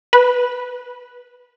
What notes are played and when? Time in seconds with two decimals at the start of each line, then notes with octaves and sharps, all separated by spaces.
0.13 B4